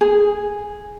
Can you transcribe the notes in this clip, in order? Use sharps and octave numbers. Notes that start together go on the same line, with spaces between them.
G#4